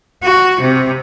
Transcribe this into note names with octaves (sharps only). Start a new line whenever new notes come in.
F#4
C3